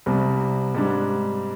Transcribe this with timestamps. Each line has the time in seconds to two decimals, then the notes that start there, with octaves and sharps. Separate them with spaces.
0.06 C2 C3 G3
0.75 G#2 G3 D4